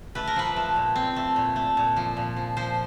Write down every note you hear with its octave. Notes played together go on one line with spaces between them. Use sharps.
A3 B4
A#4
F3 B4
A3
A#2
C4
A3
A#2
A3
A#2
F3
A#2
F3
F3 C5